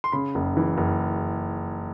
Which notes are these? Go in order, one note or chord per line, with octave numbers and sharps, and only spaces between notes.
C6
C#3 B5
F#1
E3
F#1